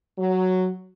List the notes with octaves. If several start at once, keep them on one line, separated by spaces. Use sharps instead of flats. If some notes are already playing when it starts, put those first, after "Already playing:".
F#3